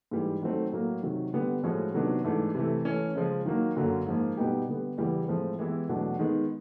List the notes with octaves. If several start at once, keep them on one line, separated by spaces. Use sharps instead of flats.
G#2 E3 G3
D#3 F#3 A3 C4
A2 F#3 A#3
C3 D#3 F#3
D3 G3 B3
A2 F3 G#3 C#4 F#4
C3 D#3 F#3 B3 D4
G#2 E3 A3 D4
C3 E3 A3
E3 A3 C#4
C#3 F3 G#3
D#3 F#3 A#3
F#2 D3 F#3 A#3
G#2 F3 A#3
B2 G3 B3 D#4 G4
D3 G3 B3
E2 C#3 E3 G3
A2 F3 G#3 C4
E3 G#3 B3 E4 G4
E2 B2 F#3 A3 D4
D#3 G#3 B3